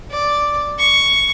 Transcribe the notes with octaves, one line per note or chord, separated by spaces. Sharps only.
D5
C#6